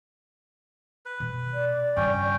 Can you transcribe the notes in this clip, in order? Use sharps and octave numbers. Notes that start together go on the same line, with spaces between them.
B4
B2
D5
G2 C#3 C#4 G5